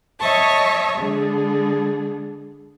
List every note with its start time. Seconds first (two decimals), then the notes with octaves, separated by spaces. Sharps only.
0.19 C#5 D#5 E5 A5 C#6
0.97 D3 G#3 G#4